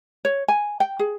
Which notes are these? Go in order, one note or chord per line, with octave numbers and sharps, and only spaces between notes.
C#5
G#5
G5
G#4